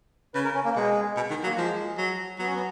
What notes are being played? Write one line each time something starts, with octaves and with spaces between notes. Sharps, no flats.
C#3 B4
A#4
C#4
A#3
B2 G#3
B2
D#3
F#3 A#3
F3 G#3
F#3
F#3 B3
C#4
B3